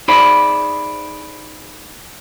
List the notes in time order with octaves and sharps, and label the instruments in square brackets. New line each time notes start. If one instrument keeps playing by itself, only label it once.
[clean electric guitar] D#4 G#4 C5 D5 E5 B5